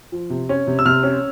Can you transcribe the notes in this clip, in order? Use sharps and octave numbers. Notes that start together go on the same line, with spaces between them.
F3
C3
C#4
C3
E6
C3 F6
C#4